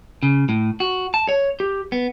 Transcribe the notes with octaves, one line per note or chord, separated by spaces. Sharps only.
C#3
A2
F#4
A5
C#5
G4
B3